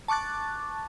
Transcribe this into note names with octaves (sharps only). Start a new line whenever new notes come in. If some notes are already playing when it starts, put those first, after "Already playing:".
A5 C#6 D6 F#6 A6